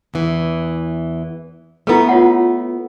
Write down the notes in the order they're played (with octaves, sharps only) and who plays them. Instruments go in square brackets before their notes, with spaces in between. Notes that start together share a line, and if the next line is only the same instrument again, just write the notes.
[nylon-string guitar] E2 E3
[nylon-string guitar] A3 B3 [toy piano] E4 A4 B4
[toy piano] F4 C#5 F#5